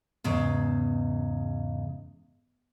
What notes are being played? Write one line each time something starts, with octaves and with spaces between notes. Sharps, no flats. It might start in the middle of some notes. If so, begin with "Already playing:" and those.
E2 G#2 C#3